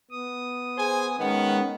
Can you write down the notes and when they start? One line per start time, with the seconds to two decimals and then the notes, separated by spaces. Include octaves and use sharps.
0.11 B3 D#6
0.78 G#4 C5 G#5
1.19 D#3 G#3 B3 C#4